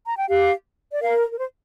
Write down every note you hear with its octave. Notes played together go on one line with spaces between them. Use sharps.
A#5
G5
G4 F5
D5
A#4 F5
A#4
C5